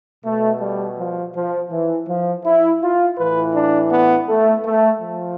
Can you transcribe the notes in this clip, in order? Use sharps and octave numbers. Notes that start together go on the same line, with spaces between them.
B2 A3
G3
F3
F3
E3
F3
E4
F4
A2 E3 B4
D4
B3
A3
A3
F3